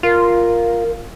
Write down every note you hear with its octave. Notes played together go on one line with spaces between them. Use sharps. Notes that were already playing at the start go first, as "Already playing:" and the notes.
F4 A#4